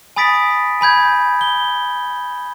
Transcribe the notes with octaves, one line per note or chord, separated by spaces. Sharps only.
G#5 B5 D#6 A6 B6 D7
G#5 B5 G6 G#6
G7